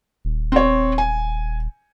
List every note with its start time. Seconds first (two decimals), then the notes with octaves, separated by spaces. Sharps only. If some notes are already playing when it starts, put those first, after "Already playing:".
0.25 D#1
0.52 C4 C#5
0.98 G#5